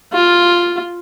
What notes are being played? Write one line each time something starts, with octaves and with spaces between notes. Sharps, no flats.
F4